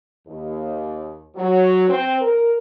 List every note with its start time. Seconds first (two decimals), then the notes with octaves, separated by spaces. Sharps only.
0.27 D#2
1.36 F#3
1.89 C4
2.21 A#4